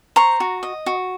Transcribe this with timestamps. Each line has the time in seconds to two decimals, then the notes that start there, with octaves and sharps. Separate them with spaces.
0.16 C5 A#5 C#6
0.40 F#4
0.63 D#5
0.86 F#4